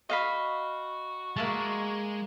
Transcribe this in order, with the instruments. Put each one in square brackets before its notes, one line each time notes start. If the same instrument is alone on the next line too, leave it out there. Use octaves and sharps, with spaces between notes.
[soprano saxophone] F#4 [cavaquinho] D#5 F5 B5
[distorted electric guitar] G#3 [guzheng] A#3 E5 A5